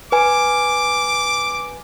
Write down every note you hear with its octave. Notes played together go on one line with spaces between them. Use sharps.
B4 G#5 D6